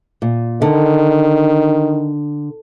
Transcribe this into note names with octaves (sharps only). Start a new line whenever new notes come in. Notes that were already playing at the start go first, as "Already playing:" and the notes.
A#2
D3 D#3